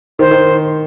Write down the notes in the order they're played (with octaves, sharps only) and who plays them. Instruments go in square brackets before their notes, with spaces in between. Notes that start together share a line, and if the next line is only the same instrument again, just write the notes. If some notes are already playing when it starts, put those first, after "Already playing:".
[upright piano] D#3 [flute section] C5
[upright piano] D#3